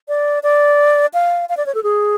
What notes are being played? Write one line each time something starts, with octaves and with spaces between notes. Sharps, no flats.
D5
D5
F5
F5
D5
C#5
A4
G#4